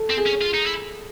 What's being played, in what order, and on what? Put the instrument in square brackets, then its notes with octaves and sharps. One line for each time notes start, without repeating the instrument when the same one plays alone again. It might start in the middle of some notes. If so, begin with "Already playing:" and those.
Already playing: [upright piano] A4
[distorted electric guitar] C4
[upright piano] G#4
[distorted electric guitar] C#4
F4
D#4
E4